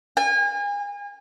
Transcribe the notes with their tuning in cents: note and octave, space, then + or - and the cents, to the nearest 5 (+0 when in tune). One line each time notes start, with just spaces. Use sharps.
G#5 -35